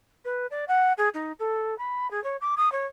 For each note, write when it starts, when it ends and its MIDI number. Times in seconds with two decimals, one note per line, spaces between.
0.25 0.47 71
0.51 0.65 74
0.68 0.93 78
0.97 1.09 68
1.14 1.32 63
1.39 1.77 69
1.78 2.10 83
2.11 2.23 68
2.24 2.37 73
2.41 2.55 86
2.57 2.71 87
2.72 2.86 73